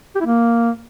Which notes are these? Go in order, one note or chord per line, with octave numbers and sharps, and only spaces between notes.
G4
E4
A#3